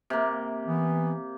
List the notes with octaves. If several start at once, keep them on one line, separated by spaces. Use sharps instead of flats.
C3 A#3
E3 B3